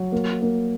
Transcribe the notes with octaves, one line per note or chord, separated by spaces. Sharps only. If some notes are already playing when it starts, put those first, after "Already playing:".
Already playing: F#3
A#3
A#3